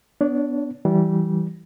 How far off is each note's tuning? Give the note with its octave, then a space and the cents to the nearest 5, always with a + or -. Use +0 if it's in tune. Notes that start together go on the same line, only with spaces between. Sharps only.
B3 +10 D4 -5 C#5 +30
E3 +0 G3 -20